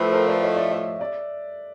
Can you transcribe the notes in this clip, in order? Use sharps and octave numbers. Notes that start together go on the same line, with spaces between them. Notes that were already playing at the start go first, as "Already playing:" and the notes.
Already playing: A2 F3 A3 A4 B4
A#4 C5
C5 D5
C#5 D#5
D5 E5
D5 E5
D5 E5